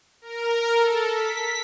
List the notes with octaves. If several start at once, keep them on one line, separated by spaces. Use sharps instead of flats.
A#4
A4
B6